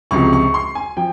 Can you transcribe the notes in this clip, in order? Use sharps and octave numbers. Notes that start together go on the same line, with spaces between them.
C#2 C3 F3 C#6
C#6
C6
G#5
F3 G5